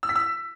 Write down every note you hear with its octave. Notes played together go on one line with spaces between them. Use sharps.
E6
B6
E6